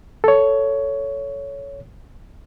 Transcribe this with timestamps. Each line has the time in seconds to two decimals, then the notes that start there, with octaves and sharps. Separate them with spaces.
0.24 A4 C#5